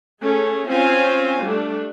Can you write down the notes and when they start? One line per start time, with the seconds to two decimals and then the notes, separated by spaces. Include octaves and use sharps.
0.22 A3 C#4 G#4
0.69 C4 C#4 F4 F5 G#5
1.43 G3 A3 D4